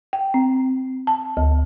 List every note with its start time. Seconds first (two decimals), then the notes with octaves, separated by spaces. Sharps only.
0.13 G5
0.34 C4
1.07 A5
1.37 D2